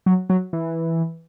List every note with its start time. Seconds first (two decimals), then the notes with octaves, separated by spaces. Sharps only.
0.06 F#3
0.30 F#3
0.53 E3